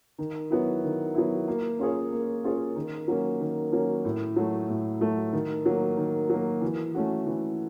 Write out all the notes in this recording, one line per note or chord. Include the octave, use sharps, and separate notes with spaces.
D#3
F#3 B3 E4
D#3
F#3 B3 E4
A#3
C#4 F4 G#4 C#5
A#3
C#4 F4 G#4 C#5
D#3
F#3 A#3 C#4
D#3
F#3 A#3 C#4
A2
F#3 A3
A2
F#3 A3
D#3
F#3 A#3
D#3
F#3 A#3
E3
A3 C#4 F#4
E3